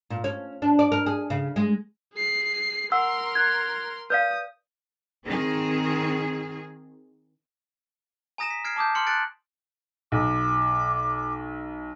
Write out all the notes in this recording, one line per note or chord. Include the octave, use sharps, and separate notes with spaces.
A#2
C#4
D4
D5
A#4
G#4
C#3
G#3
G#4 C7
A#4 F#5 C6 E6
F#6 G#6
B4 D5 F5 D#6 G6
D#3 C4 G#4
G#5 A#5 D#6 A#6 D7 E7
B6
F6 G#6 C7 D7
A5 D6 D#6 G6
C6 F6 C#7 F#7
F#6 A6 C#7 D7
B1 D6